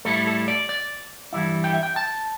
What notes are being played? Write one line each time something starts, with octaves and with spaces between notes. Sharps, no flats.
A2 G3 E4 A4
A4
D5
D5
G2 E3 G3 E4
G5
E5
G5
A5